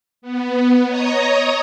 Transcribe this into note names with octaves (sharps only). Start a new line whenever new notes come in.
B3
C#5 D#5 A#5 D#6